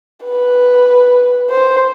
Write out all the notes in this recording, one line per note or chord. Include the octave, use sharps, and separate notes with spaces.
B4
C5